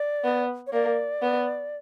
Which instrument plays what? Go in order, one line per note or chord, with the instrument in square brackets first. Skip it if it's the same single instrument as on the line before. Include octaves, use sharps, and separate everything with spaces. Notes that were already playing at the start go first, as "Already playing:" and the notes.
Already playing: [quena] D5
[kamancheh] B3
[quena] C#5
[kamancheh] A#3 [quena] D5
[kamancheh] B3